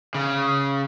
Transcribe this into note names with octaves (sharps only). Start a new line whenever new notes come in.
C#3